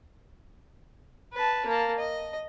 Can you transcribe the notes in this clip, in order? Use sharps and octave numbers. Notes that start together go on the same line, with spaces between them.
B4 A5
A#3 A5
D#5